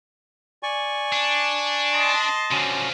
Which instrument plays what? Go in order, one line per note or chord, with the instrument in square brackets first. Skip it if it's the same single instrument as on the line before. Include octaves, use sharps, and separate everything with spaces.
[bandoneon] D5 G#5 C#6
[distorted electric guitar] D4
[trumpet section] D#5 A5 C6
[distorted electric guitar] D3 F3 [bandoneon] C#4 F#4